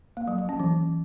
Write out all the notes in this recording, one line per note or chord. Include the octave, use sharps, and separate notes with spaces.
A#3
F#3
F#3
C#4
E3